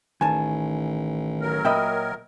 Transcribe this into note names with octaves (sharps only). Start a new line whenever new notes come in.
A1 D#3 G#5 A5
F#3 A#4
A#2 D#5 E5 G5 B5